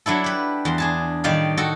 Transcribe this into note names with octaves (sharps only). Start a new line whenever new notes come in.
F#3 D4 E4 A4
G4 B4
E2 C6
D4 G#4 A5
A2 D#3 G3 D#4 D5 F5
F#4 A4 D#5 A5